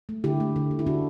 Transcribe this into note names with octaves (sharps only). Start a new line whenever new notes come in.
A3
D3 E4 G4
A3
D3
A3
E4
D3 D4 F#4